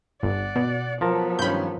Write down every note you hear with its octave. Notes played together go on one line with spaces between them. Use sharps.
G1 D5 F#5
B2
F3 F#3 B3 A#4 A5
G2 D#3 C#4 B5 G6